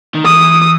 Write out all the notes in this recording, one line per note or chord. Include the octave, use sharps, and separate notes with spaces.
D#3
E3 D#6